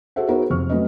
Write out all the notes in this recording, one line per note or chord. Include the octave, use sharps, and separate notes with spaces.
F#4 G#4 A4 C5 E5 F#5
B3 D#4 F#4 G#4 A#4 C5
F2 C3 C#6 F6
F#3 A3 C4 C#4 B4 D#5